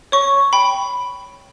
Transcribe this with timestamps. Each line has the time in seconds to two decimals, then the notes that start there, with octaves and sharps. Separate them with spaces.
0.12 C#5 C#6
0.53 G5 B5